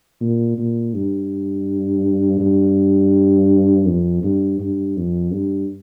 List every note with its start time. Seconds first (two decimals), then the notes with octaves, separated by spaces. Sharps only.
0.21 A#2
0.58 A#2
0.94 G2
2.40 G2
3.87 F2
4.24 G2
4.60 G2
4.97 F2
5.33 G2